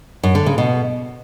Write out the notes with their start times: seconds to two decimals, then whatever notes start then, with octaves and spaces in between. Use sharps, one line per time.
0.23 F#2
0.35 D3
0.46 C#3
0.58 B2